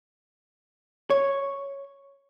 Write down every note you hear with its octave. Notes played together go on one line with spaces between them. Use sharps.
C#5